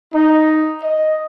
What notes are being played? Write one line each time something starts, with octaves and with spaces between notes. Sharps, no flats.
D#4
D#5